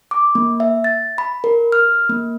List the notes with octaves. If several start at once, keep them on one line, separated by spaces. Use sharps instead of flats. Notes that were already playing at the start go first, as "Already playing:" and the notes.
D6
A#3
E5
A6
B5
A#4
F6
A#3